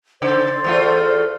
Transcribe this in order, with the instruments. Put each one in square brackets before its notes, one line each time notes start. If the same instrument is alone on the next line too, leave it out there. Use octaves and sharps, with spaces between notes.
[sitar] C#3 [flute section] C5 D5
[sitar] E2 A3 F4